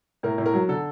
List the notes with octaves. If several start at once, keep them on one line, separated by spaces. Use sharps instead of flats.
A2 A#4
A2
A#4
F#3
D3 A4